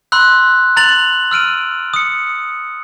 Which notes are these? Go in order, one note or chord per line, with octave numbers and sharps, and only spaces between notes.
B5 C6 E6 F#6
A#5 F#6 A6 F7 F#7
E6 F6 D7 D#7
D#6 C#7